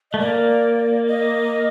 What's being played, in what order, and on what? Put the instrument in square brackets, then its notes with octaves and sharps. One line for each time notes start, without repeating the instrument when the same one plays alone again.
[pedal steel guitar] A3 [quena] D#5
[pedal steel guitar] A#3 [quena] D5
[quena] D#5